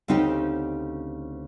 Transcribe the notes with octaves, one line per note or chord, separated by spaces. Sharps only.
D2 C#3 C4 D#4 G4